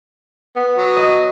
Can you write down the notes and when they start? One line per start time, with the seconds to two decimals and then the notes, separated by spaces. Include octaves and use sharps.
0.56 B3
0.77 F#3
0.97 D#5